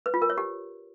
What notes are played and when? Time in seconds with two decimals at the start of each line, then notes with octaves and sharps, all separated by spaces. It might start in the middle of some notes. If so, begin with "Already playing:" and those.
0.06 B4
0.14 F4
0.22 A#4
0.30 C#5
0.38 G4